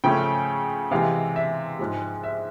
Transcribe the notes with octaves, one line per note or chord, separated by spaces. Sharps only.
C#3 F3 A3 C#4 G5
C3 E3 G#3 F5
E5
G#2 F3 G#3
E5